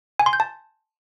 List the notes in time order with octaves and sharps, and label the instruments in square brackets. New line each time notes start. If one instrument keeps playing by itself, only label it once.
[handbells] G#5
C6
G6
A5